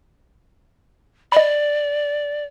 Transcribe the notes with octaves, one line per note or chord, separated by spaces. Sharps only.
D5 D#5 B5